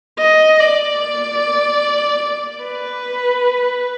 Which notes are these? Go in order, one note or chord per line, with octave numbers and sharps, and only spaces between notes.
D#5
D5
B4